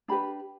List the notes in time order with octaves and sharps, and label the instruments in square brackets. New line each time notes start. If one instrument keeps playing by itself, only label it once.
[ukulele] D4 G4 B4 B5